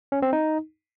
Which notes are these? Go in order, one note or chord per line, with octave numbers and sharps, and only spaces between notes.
C#4
C4
D#4